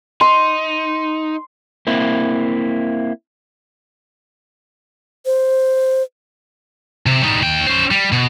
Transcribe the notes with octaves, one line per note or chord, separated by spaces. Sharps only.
D#4 C6
A#3 C4 E4
C5
C3
G3 D#4
D#2 G5
C#4 C5
G3
B2